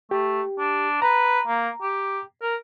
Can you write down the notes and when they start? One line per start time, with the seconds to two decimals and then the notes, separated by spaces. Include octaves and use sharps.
0.11 A3 G4
0.59 D4
1.02 B4 A#5
1.47 A#3
1.82 G4
2.42 A#4